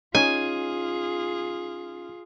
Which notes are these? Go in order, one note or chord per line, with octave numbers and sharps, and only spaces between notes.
C#4 D#4 F4 G#4 G#5